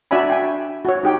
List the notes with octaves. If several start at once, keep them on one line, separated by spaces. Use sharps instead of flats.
D4 F#4 D5 E5 G#5 B5
G5 G#5
F#4 C#5
D#4 G4 G5